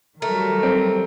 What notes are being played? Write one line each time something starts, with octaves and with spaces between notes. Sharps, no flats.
D#3 F#3 G3 A3 A#4
C4